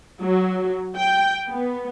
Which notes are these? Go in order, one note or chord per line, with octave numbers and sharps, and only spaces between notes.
F#3
G5
B3